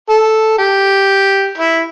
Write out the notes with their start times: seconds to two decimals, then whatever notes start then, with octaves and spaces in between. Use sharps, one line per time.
0.09 A4
0.58 G4
1.58 E4